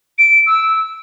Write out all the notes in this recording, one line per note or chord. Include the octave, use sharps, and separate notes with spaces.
D7
E6